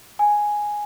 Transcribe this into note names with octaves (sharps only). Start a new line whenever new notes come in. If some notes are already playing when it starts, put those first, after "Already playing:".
G#5